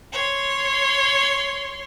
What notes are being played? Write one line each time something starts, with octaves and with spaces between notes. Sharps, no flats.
C#5 C6